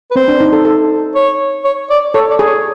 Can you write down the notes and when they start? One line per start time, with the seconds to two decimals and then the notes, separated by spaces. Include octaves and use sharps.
0.11 B4
0.16 C4 C5
0.28 D4
0.40 D#4
0.53 A4
0.65 A4
1.15 C#5
1.65 C#5
1.90 D5
2.14 A4 C#5
2.30 D5
2.39 G#4
2.47 C#5